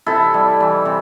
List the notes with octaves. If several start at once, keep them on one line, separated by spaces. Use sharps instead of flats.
C3 E4 A4
G3
E3
C3